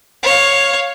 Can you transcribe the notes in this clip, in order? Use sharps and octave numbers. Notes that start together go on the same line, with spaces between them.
C#5 F5